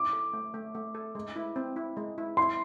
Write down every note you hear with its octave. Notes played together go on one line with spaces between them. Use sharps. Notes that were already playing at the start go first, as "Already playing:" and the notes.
Already playing: E4 D6
A4
A3
A3
A3
A4
G#3
E4
C4
E4
G#3
E4
E4 C6